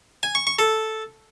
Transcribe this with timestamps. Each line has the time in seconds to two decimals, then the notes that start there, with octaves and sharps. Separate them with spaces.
0.23 G#5
0.35 C#6
0.47 C#6
0.59 A4